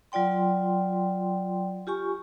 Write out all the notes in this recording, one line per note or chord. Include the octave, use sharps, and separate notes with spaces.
F#3 F4 D5 G5 C6
F4 G4 G#5 C#6